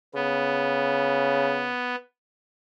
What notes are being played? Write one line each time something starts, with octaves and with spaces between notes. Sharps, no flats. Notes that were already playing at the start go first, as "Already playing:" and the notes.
C#3 B3